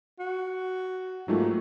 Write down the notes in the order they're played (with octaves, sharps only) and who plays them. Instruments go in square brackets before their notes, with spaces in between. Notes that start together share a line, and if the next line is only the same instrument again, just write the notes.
[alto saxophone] F#4
[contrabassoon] G#2 [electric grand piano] F#3 A3 A#3 [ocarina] F4 [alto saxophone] G4